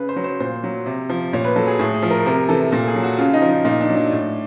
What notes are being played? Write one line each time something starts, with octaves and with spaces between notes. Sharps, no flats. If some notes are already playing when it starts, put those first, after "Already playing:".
Already playing: C#3 B4
C5
F#3
C5
A#2 C5
F#3
C3
F3
A#2 C#5
B4
F#3 A4
G#4
A2 G#4
G#4
F3
A#4
C3 A#4
E3 A4
A#2 A4
G#4
F#3
F#4
C#3 F4
D#4
F3
D#4
A#2 D#4
D4
F#3
D4
A2